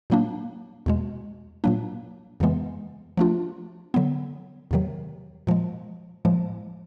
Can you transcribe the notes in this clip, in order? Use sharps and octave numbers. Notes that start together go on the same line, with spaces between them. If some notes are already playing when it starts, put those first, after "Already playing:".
A#2 F#3 A#3 D4
E2 B2 G#3
A#2 F#3 A#3 D4
F2 C#3 E3 G#3 B3
F3 A3 D4 F4
D3 F#3 B3
E2 C3 D#3 F#3
A#2 F3 G#3
A2 F3 G#3